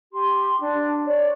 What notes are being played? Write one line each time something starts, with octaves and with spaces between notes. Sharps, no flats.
G4 C6
D4
C#5 D5